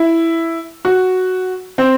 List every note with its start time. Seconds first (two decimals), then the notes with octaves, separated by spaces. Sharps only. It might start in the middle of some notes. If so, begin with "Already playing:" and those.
Already playing: E4
0.85 F#4
1.78 C4